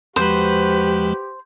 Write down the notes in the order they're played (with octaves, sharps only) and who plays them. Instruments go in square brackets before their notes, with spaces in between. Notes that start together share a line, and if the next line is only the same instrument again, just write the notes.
[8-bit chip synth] E2 F3 G#3 [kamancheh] F#4 B4 [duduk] G4 [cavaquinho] C5